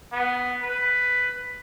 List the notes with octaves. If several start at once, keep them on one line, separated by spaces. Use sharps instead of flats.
B3
B4